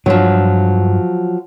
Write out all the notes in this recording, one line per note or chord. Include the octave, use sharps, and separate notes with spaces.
G2 F3 F#3 D4